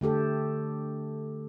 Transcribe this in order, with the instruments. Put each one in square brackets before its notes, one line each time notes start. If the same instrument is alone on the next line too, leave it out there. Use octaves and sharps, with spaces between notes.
[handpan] D3 A3 G4 A4